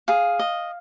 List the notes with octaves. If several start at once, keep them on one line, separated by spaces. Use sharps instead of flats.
G#4 F5
D#5